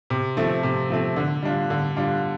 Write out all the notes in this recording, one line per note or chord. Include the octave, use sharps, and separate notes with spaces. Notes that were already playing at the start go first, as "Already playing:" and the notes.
C3
F3 A3 C4
C3
F3 A3 C4
D3
G3 D4 F4
D3
G3 D4 F4